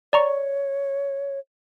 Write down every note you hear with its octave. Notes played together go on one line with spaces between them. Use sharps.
C#5 D5 A#5 C#6